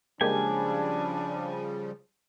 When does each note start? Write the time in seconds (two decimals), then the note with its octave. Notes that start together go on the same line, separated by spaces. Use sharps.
0.21 C#3 F3 G3 G#3 A#3 D4 G4 G#5